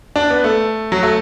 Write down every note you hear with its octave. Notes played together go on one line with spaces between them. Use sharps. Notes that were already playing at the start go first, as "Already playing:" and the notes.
D4
B3
A3
F#3
A3